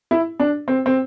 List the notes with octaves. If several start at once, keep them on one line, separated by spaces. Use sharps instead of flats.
E4
D4
C4
C4